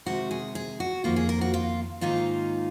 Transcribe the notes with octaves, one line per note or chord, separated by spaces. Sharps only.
C3 D#3 G#3 F#4
G#4
G#4
F#4
F2 D#3 A#3 F4
G#4
A#4
F#4
F4
G#2 D#3 A#3 D#4 F4